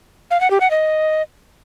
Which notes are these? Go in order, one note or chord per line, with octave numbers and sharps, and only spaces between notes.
F5
F#5
G4
F#5
D#5